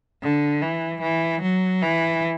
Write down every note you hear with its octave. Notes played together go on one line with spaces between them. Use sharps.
D3
E3
E3
F#3
E3